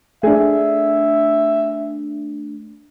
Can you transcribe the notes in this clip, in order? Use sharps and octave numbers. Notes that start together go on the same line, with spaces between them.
A3 D4 G#4 E5